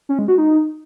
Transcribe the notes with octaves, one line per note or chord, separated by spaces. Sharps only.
C#4
G#3
F#4
D#4